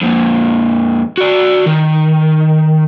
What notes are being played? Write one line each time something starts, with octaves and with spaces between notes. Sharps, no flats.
F2 A#2
F#4 D5
D#3